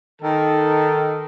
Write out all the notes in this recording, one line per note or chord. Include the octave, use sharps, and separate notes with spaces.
D#3 A4